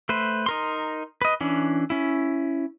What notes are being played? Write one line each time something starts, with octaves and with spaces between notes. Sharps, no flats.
A3 B4 C5
D#4 A#4 C6
B4 D#5
E3 C#4 D4
C#4 E4